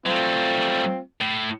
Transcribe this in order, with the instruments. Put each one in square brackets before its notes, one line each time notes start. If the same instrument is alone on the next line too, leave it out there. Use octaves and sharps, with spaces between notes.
[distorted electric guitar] F#3 G3 [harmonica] A3 C4 F4
[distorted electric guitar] A2